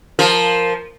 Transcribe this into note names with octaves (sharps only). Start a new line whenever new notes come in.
F3 A#4